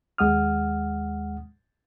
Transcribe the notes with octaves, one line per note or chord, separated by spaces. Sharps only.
D#2 G#3 F#5 D#6 F6